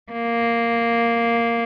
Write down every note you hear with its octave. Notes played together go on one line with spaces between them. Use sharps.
A#3